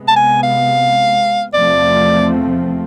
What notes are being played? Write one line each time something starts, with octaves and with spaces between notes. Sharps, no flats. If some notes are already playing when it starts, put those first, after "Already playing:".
Already playing: C3 G#3 B3
A5
G#5
F5
E2 C3 F3 A3 C4 D5